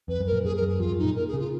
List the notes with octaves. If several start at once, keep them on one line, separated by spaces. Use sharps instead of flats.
F2 B4
F#2
A#4
A#2
F#2 G#4
A#4
F#2
G#4
F2 F4
F#2
A#2 D#4
A#4
G#4
C#3
F4